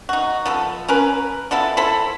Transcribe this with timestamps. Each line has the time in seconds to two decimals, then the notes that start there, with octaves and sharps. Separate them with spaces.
0.09 D#4 F#4
0.46 F3 B3 A4
0.88 C#4 A#4 B4
1.51 F3 B3 E4 A4
1.77 E4 A4 C5 B5